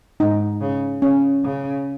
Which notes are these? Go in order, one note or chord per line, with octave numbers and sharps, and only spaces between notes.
G#2 D#4
C#3
C#3 C#4
C#3